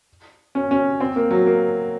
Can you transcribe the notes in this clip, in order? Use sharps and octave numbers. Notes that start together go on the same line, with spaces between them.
C#4
C#4
C4
A#3
F#3
A#3